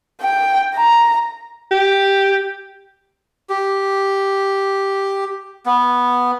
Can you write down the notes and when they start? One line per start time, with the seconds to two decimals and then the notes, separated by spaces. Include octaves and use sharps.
0.22 G5
0.75 A#5
1.71 G4
3.50 G4
5.66 B3